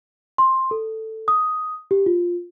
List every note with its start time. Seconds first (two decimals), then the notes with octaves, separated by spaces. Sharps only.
0.38 C6
0.71 A4
1.28 D#6
1.91 G4
2.06 F4